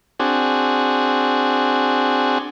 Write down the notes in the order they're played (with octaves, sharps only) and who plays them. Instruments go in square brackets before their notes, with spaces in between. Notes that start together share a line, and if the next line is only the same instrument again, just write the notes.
[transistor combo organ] C4 D4 F#4 G#4